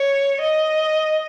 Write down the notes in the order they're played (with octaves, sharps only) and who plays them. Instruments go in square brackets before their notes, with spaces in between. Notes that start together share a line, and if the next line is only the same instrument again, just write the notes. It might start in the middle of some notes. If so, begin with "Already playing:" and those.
Already playing: [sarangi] C#5
D#5